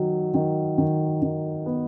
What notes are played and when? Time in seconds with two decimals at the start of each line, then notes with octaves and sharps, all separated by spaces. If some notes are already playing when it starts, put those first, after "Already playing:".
Already playing: D#3 F#3
0.34 D#3
0.78 D#3
1.22 D#3
1.66 B3